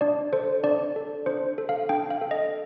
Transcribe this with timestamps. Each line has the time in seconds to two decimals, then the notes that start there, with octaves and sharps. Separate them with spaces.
0.01 D4 D5
0.33 A4 C5
0.63 D4 D5
0.96 A4
1.26 D4 C5
1.58 A4
1.69 F5
1.89 D4 G5
2.10 F5
2.21 A4
2.31 D#5